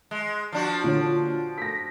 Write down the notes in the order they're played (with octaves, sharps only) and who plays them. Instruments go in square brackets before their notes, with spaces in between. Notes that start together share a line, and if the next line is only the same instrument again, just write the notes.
[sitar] G#3
F3 D4 F#4
[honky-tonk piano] A#2 D3 C#5
A#6 B6